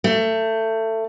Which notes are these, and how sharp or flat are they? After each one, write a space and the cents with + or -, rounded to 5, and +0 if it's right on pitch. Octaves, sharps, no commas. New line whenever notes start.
A3 +20